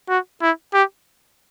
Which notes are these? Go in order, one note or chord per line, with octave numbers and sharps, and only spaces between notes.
F#4
E4
G4